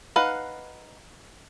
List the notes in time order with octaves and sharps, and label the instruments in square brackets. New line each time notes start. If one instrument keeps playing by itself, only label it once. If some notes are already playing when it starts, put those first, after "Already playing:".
[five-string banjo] D#4 B4 F5 F#5